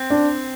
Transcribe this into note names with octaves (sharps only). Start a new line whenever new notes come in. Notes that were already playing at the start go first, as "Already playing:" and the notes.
Already playing: C4
D4